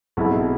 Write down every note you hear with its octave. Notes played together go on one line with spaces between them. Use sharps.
B1 B2 G#3 C4 E4